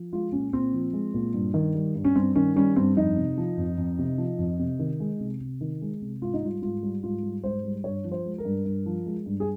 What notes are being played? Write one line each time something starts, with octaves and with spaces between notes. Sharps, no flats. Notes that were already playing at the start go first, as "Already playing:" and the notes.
Already playing: F3
G#3 F4
A#2 C#4
A#2 C4
F3
G#3
A#2
G2
D#3
G3
G2
C#4
G2 C4
D#3 C#4
G3 C#4
G2 C4
F2 D#4
C3
F3
F2
F2
C3
F3
F2
C3
D#3
G#3
C3
C3
D#3
G#3
C3
G#2 F4
D#4
G3 F4
G#2 F4
G3
G#2 F4
G3
G#2 C5
G3
G2 C#5
F3
C5
G#3
A#4
G2
G2
F3
G#3
G2
G#4